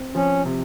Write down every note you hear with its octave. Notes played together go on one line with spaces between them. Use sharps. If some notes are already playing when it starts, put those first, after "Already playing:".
Already playing: C4
F3 C#4
C3